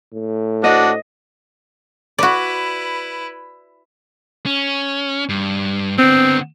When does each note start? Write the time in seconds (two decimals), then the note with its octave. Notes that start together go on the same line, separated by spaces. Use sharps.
0.13 A2
0.64 D4 F#4 D#5
2.19 E4 F#4 B4 D5
4.46 C#4
5.29 G2
5.99 D3 B3 C4